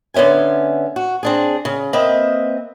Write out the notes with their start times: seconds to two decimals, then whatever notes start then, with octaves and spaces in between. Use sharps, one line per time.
0.14 D3 B3 C#4 E5 G#5
0.96 F#4
1.23 C4 D4 G#4
1.65 C#3
1.93 A#3 C4 B4 D#5 E5